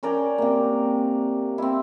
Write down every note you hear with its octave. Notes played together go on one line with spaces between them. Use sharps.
C#4 A#4 D5 G5
C3 A#3
C4 E4